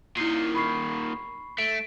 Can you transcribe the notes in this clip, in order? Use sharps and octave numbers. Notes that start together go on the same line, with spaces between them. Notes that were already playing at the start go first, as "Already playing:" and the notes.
A#2 D#3 E4 C7
B5 C#6 C7
A3 D7